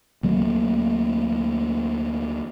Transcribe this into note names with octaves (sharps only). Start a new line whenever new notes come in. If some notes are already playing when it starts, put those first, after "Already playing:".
D2 F#3 A3 A#3